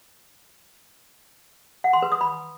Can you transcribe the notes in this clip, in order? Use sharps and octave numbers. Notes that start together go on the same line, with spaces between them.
F#5
C6
B4
D#6
B5